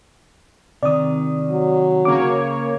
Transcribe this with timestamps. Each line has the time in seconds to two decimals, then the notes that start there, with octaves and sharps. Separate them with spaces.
0.83 C3 D#3 D5 D#6
1.51 F#3
2.05 C#3 A#3 C#5 D6